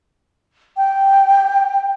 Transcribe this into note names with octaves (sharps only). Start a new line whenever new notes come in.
G5